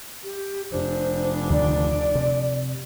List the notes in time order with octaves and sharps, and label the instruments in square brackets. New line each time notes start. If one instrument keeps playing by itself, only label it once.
[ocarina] G4
[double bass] F1 D4 [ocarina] C5
[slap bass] D2 D#3 F3 [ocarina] D5
[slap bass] C3